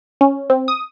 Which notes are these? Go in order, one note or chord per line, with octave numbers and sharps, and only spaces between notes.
C#4
C4
D#6